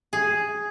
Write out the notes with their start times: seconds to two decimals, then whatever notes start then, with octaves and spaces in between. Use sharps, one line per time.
0.13 G#4